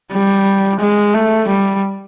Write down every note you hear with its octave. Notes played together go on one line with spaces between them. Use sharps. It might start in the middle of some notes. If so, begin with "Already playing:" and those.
G3
G#3
A3
G3